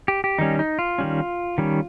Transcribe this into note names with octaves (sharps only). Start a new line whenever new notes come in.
G4
G4
D#3 G3 C#4 D#4
D#4
F4
D#3 G3 C#4
D#3 G3 C#4